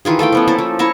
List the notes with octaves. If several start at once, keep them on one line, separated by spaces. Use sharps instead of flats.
D#3 E3 F4 G#4
A3 F4 F5 G5
F3 B3 C#4
A3 A#3 E4 A4
F3
E4 C#5 A5 A#5